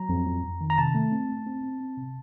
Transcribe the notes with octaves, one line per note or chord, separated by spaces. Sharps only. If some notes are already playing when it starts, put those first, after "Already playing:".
Already playing: F#3 A#5
F2
F2
F2
D#3
A#5
C3 A5
A3
C4
A3
C4
C4
C4
C3